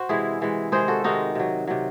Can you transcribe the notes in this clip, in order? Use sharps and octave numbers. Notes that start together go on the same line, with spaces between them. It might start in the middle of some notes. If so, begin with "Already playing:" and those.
Already playing: F#4 C5
C3 E3 G#3 E4 G#4
C3 E3 G#3
C3 D#3 G#3 G#4 C5
F#4 A4
C3 D#3 G#3 D#4 F#4
C3 F#3
C3 F#3